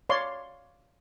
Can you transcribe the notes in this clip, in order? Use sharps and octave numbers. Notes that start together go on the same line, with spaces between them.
C#5 D5 F5 C6